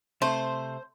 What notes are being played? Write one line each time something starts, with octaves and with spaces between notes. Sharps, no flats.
C3 A3 C5